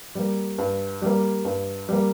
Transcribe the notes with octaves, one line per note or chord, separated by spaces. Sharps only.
G3 A#3
G2
G3 A#3
G2
G3 A#3